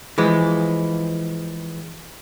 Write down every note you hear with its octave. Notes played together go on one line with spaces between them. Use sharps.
E3 F3 G#3